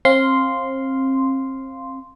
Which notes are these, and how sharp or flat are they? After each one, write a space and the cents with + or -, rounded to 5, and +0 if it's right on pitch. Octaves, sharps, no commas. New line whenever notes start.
C4 +35 F5 +0 C6 -5